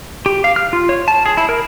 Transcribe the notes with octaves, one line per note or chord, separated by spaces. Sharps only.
G4
F5
F6
F4
C#5
A5
G#4
E4
A#4